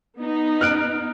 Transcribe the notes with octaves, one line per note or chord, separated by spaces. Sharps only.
B3 D#4
F6 F#6 D7